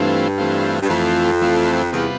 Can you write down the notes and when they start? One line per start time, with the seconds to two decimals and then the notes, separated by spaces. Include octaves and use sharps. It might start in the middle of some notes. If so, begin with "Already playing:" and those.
Already playing: G2 E3 A3 C4 F4
0.38 E3 A3 C4 F4
0.83 G2
0.89 F2 E3 A3 C4 F4
1.41 E3 A3 C4 F4
1.93 E2 C3 G3 B3 F4 B4